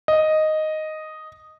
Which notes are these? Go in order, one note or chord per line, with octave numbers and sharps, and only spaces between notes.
D#5